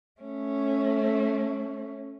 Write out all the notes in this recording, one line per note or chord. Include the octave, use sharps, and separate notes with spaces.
A3 C#4